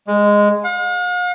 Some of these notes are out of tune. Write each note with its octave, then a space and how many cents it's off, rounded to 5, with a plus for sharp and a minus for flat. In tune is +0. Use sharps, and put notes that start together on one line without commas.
G#3 -10
F5 +45